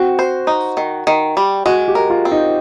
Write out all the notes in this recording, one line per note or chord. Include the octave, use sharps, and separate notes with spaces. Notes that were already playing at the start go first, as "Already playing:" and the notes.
Already playing: C4 F#4
C5
D#4
D#3
D#3
G3
G#3 F#4
G4
A#4
F4
C4
D#4